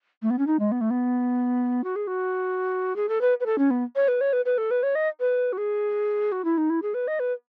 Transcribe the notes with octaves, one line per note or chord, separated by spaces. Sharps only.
A3
B3
C#4
D#4
G#3
B3
A3
B3
F#4
G#4
F#4
G#4
A4
B4
B4
A4
C#4
B3
C#5
B4
C#5
B4
B4
A4
B4
C#5
D#5
B4
F#4
G#4
F#4
E4
D#4
E4
G#4
B4
D#5
B4